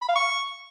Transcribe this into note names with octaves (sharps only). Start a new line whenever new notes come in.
B5
F5
C#6